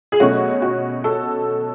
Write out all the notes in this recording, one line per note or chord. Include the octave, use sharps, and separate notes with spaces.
G#4
B2 F#3 A3 C#4 F#4
F#4
A4